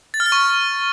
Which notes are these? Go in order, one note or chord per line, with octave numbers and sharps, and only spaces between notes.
A6
F6
A6
C#6